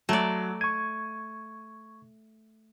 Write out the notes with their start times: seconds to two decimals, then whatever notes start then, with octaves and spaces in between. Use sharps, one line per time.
0.09 F#3 A3 D5
0.61 C#6 G#6 D#7